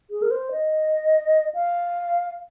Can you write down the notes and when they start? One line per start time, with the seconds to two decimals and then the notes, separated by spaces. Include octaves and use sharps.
0.10 G#4
0.22 A#4
0.31 C5
0.51 D#5
1.54 F5